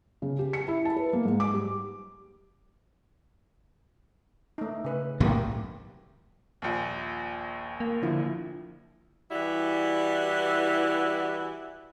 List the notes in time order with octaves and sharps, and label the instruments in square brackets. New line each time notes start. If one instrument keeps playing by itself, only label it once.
[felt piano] C#3
G4
C#7
E4
A5
B4
A#3
G#2
D6
G3
[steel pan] A3 D#4
C#3 B4
[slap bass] B1 A2 A3 [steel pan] D#3 A#3 G4
[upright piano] A#1 D#2
[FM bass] A#3
[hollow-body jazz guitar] D3 F3 E4
[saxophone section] E3 G3 E4 F#4